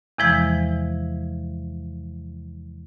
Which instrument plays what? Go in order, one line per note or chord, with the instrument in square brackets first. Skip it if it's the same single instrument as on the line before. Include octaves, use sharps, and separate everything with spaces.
[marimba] E2 C3 E3 F3 G#3 G#6